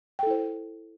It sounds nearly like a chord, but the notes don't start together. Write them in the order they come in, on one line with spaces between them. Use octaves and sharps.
G5 A4 E4 C5